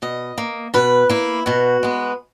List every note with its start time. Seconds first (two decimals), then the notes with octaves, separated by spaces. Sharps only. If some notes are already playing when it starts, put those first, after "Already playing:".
0.02 B2 D#5
0.38 A#3
0.74 B2 B4
1.09 A#3 E4
1.46 B2 F#4
1.83 G#3 B3